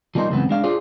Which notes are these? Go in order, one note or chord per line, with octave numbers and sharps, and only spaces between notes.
F3 G3 A#3 D#4 C5
C#2 F#2 E3 B3 C4
G#3 D4 F5
F4 G#4 C5 D5